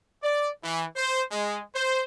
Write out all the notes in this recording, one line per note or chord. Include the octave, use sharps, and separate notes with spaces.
D5
E3
C5
G#3
C5